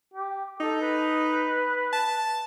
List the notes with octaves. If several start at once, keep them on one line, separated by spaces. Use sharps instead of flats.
G4
D#4 A4
B4
A5